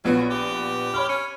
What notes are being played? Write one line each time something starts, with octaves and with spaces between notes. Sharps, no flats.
A#1 F3 F#3 B3
G4
C#5 B5 F6
C#4